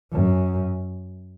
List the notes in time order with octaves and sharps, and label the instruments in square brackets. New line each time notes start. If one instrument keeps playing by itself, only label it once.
[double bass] F#2